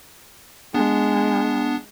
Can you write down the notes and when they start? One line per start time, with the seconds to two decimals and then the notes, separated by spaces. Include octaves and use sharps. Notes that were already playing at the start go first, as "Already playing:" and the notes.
0.74 G#3 B3 D4